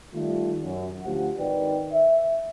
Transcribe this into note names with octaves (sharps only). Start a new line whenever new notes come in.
D#3 G3 A3 F4
F#2
D2 F3 G4 F#5
G#1 D#3 B4 D5 G5
E5